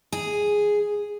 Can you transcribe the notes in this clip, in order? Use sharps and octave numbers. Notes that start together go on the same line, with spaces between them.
G#4